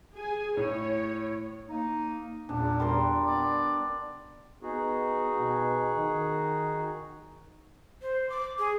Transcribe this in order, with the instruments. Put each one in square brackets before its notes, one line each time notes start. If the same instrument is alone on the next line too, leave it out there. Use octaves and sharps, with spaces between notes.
[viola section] G#4 G#5
[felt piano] A2 [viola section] C#5
[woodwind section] A#3 D#4
[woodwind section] E2 A#2 [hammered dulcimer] D4
[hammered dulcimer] G3 A#4 C6
[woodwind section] B3 D5
[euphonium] B3 [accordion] D#4 F#4 G#4
[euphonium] B2
D#3
[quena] C5
D6
G#4